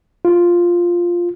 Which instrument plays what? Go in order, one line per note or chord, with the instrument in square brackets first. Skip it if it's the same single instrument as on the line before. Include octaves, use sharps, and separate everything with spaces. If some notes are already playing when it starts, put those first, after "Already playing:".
[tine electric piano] F4